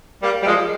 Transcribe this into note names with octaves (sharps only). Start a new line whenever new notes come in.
G3 A#3
G3
F3 G#3